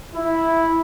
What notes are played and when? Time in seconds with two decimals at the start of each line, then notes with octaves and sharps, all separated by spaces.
0.16 E4